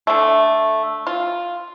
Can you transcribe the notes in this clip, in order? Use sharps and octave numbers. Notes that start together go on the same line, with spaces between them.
D3 A3
F4